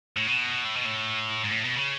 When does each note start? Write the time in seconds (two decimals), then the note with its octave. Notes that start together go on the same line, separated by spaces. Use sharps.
0.17 A2
0.27 B2
0.65 A2
0.76 B2
0.85 A2
1.44 G#2
1.51 A2
1.64 B2
1.76 C#3